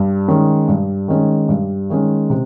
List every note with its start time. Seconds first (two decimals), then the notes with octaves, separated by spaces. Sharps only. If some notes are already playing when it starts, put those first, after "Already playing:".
Already playing: G2
0.28 D#3 G#3 C#4
0.68 G2
1.08 D#3 G#3 C#4
1.49 G2
1.90 D#3 G#3 C#4
2.30 C3